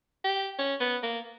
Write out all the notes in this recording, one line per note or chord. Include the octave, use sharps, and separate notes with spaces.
G4
C#4
B3
A#3